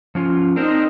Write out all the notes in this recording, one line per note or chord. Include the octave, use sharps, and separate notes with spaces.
F3 C#4 F4
C4 D4 D#4 A#4 C5